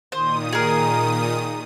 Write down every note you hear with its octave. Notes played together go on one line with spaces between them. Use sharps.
A#2 D#3 C5 D#6
G#4 A#4